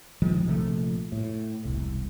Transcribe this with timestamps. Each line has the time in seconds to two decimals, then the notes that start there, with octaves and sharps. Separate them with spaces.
0.22 A#1 D#3 F3 G#3
0.46 A#1 C3 F3 A3
1.12 A2
1.65 E1 C2